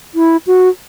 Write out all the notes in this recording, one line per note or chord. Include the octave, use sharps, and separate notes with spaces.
E4
F#4